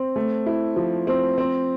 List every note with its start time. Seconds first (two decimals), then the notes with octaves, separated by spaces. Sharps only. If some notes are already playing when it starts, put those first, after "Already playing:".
Already playing: C4
0.16 A3
0.46 E4
0.76 F3
1.07 C4
1.38 C4